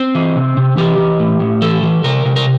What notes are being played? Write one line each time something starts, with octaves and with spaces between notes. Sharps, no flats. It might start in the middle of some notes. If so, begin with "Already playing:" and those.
Already playing: C4
E3
C3
C3
E3 G4
E3
A2
A2
E3 A4
E3
C3 A#4
C3
A#4